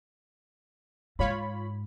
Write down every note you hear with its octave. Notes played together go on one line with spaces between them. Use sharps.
G#2 F4 C#5 B5